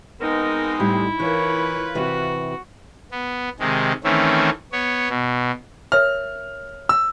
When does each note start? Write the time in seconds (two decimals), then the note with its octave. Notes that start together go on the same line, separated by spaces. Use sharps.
0.21 G#3 B3 C4 D#4 A#4
0.80 A2 G3 E4
1.20 E3 F4 A#4 B4 C#5
1.95 C3 E3 F#4
3.12 B3
3.60 C3 D#3 G#3
4.04 D#3 E3 A3 C4 C#4
4.72 B3 C#5
5.09 B2
5.92 A#4 C#5 E5 F6
6.89 E6